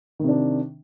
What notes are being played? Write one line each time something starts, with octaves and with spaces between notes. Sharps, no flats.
C3 D#3 D4